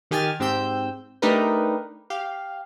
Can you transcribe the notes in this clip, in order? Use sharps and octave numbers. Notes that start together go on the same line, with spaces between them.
D#3 G4 G#5 F6 A6
G#2 C4 G4 E6 G6
A3 D4 D#4 G4 A#4 B4
G4 F5